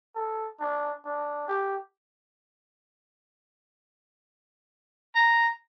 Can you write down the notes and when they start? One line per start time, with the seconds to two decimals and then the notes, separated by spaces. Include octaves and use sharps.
0.16 A4
0.60 D4
1.05 D4
1.48 G4
5.15 A#5